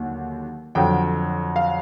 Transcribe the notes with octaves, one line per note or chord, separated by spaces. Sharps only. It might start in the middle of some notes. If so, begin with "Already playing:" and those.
Already playing: D#2 D3 F#3
F2 D3 F#3 G5
F5